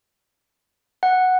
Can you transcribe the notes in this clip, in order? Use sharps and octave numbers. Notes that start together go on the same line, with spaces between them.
F#5